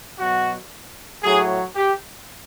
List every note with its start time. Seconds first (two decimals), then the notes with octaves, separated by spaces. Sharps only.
0.19 B2 F#3 F#4
1.23 A2 F#3 G#4
1.75 G4